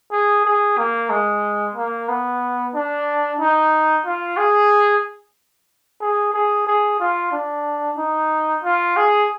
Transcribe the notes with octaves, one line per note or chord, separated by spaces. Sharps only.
G#4
G#4
A#3
G#3
A#3
B3
D4
D#4
F4
G#4
G#4
G#4
G#4
F4
D4
D#4
F4
G#4